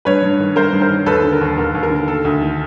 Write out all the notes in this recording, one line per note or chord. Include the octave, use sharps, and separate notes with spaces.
G2 B4 C#5
G2
D#3
G2 A#4 C5
G2
A#4 C5
D#3
D#2 A4 B4
D3
A#4
D#2
D#2 A#4
D#2
A#4
D3
D#3 A4
D2
D#3